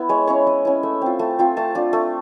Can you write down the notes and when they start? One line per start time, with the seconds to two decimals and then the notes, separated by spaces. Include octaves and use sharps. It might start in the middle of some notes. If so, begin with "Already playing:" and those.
Already playing: B3 E4
0.09 G#3 C#5
0.27 C#4 E4 C#5
0.47 G#3 D#5
0.65 C#4 E4
0.83 A3 E5
1.02 C4 F4
1.19 A3 A5
1.39 C4 F4
1.57 A3 A5
1.75 D4 F4
1.93 A3